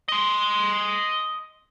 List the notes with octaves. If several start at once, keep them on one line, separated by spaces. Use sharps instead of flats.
D#5 C6